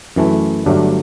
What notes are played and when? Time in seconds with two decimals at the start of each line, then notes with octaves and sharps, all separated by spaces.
0.16 F#2 E3 A3
0.66 G1 G2 F#3 A3 D4